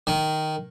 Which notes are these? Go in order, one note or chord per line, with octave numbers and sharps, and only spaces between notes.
D#3